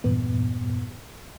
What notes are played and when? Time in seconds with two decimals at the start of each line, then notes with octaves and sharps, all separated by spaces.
0.04 E2 G2 A#2 B3